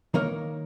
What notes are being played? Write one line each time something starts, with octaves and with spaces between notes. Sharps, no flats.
D#3 A#3 D#4 A#4 C#5